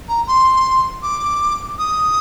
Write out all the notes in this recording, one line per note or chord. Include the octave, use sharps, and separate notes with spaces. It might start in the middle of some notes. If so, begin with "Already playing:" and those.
A#5
C6
D6
D#6